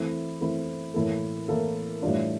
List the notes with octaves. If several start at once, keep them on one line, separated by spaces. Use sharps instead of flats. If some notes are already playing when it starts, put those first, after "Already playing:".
Already playing: E3 A3 C4 E4 A4
E3 A3 C4 E4 A4
A2 E3 A#3 E4 A4
A2 E3 A#3 E4 A4
A2 E3 G3 D4 F4